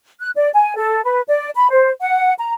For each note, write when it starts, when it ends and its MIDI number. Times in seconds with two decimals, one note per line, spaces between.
0.20 0.30 90
0.36 0.49 74
0.54 0.73 80
0.75 1.03 69
1.04 1.21 71
1.28 1.50 74
1.56 1.70 83
1.70 1.89 72
2.00 2.33 78
2.38 2.52 82